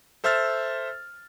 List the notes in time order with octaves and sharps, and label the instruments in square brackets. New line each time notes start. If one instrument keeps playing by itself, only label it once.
[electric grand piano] A4 C5 E5 E6 F6 A6